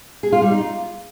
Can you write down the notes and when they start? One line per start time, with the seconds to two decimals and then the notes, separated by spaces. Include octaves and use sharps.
0.23 G#4
0.32 F4
0.42 G3
0.51 D#4
0.60 F4